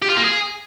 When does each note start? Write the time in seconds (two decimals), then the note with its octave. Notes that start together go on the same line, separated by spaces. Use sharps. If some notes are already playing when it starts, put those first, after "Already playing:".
0.02 G4
0.10 F4
0.17 A#3
0.24 G#4